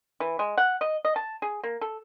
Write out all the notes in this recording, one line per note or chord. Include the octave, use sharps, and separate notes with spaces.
E3
G#3
F#5
D#5
D#5
A5
G#4
A#3
A4